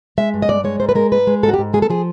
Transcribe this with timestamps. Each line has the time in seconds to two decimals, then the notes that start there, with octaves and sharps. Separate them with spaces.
0.18 G#3 E5
0.34 G2
0.42 D#5
0.49 G2 D5
0.64 G#3 C#5
0.80 G#2 C5
0.89 B4
0.95 G#3 A#4
1.12 G#2 B4
1.27 G#3
1.43 G#2 A4
1.48 F#4
1.54 G4
1.58 G#2
1.73 G#3 G#4
1.82 A4
1.90 F3 G#4